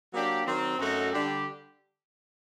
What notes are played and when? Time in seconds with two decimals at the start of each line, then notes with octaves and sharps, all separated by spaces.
0.12 F#3 A#3 D4 G4
0.45 D#3 F#3 C4
0.79 F#2 F#3 A3 D#4 F#4
1.12 D3 G3 D4 G4